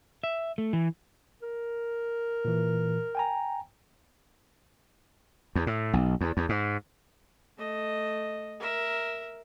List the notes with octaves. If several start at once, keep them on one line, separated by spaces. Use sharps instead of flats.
E5
A3
E3
A#4
A#2 E3
G5 G#5 A#5
E2
A2
B1
E2
E2
G#2
A3 D#5
A#4 E5